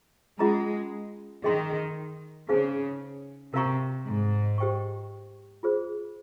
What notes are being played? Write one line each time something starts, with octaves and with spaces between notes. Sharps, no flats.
G#3 C#4 F4 G#4 D#5 A#5
D#3 G#4 D#5 G5 C6
C#3 D#4 G#4 C5 F5 G#5
C3 A#4 F5 A#5 C#6
G#2
G4 C5 G5 C#6
F4 G#4 C5